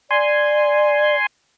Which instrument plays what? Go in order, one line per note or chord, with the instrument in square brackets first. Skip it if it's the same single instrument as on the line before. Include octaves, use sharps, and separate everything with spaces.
[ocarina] D5 [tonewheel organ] G#5 C6